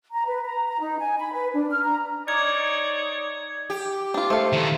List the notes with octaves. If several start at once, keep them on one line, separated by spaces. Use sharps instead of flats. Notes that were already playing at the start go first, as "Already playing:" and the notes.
A#5
B4
A#5
A#5
D#4
G#5
B5
B4
D4
F6
A#5
D#4 C#5 D5 G#6
G4
D4 F4
A3 A4 C5 F5
D#3 E3